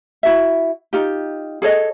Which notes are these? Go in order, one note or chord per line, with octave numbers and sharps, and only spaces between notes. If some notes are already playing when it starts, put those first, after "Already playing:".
E4 F#4 E5
D#4 F4 G4
G#4 A4 C#5 D#5